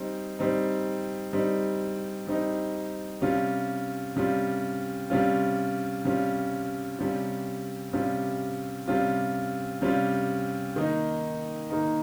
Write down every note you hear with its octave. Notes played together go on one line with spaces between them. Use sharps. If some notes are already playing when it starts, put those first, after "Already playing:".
Already playing: G3 C4 D#4
G3 C4 D#4
G3 C4 D#4
G3 C4 D#4
C3 G3 C#4 F4
C3 G3 C#4 F4
C3 G3 C#4 F4
C3 G3 C#4 F4
C3 G3 C#4 F4
C3 G3 C#4 F4
C3 G3 C#4 F4
C3 G3 C#4 F4
D#3 A#3 D#4
D#3 A#3 D#4